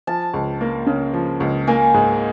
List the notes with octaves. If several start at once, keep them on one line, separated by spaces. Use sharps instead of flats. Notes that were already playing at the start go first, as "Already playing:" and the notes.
F3 A5
C#2
A#3
C#3
F3
C#2
A#3 G#5
G#2